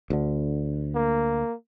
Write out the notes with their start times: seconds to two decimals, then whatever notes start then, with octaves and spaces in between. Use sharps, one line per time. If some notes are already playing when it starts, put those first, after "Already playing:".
0.10 D2 D3
0.95 A#3